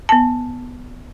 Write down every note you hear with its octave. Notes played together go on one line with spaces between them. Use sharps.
B3 A5